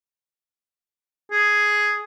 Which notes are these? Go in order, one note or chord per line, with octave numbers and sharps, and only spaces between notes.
G#4